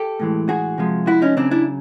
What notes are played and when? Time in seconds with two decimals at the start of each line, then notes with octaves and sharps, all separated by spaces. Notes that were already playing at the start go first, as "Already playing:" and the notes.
Already playing: G4 A4
0.20 A2 E3 G#3
0.49 F#4 G#4
0.78 C3 F3 G#3
1.07 E4 F#4
1.22 C#4 D#4
1.37 C#3 F#3 C4 D4
1.51 D4 E4